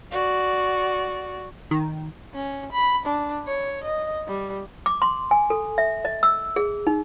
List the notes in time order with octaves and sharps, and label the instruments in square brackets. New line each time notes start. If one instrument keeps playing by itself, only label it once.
[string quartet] F#4 D5
[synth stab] D#3
[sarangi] C#4
B5
D4
C#5
D#5
G3
[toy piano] D6
C6
G#5
A4
E5
D#5
E6
G#4
D#4